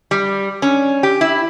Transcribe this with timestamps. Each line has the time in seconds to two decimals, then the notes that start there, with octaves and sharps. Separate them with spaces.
0.11 G3
0.62 C#4
1.03 G4
1.21 E4